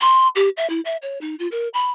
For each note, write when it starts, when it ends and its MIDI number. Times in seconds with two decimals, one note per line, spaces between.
0.01 0.28 84
0.35 0.49 67
0.57 0.67 76
0.70 0.80 64
0.85 0.97 76
1.02 1.18 73
1.21 1.35 63
1.39 1.47 65
1.51 1.68 70
1.74 1.91 83